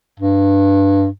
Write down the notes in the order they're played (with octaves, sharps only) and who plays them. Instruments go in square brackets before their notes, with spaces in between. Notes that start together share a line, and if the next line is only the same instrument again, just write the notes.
[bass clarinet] G2